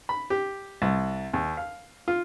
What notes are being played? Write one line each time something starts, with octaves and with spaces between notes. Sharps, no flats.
B5
G4
C2
D#2
F5
F4